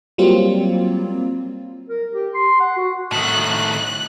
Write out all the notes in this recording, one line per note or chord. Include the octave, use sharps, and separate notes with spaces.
F#3 G3 A#3 C4 F4
A#4
G4
C6
F#5
F#4
A2 D#3 F#6